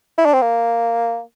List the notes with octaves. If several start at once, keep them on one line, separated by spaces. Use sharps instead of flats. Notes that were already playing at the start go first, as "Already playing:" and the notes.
E4
D4
C4
A#3